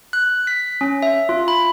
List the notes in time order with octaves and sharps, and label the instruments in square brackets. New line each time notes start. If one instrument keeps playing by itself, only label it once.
[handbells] F#6
B6
C#4
E5
F4
B5